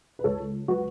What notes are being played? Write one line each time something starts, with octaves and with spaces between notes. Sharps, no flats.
B4
C#2 A4 C#5
F#3 F#4 B4